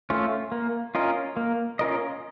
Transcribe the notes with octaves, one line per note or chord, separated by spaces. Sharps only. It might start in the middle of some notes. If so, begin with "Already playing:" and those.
A3 C#4 F4
A#3
C#4 F4 A#4 D#5
A#3
C#4 F4 A#4 D#5